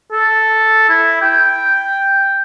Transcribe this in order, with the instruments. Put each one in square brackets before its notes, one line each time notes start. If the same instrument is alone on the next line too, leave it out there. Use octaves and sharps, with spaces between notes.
[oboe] A4
E4
G5